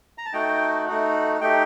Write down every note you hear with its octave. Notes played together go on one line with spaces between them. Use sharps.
A#5
A5
A3 D#4 F#4 G5
A3 D#4 F#4
A3 D#4 G4 G5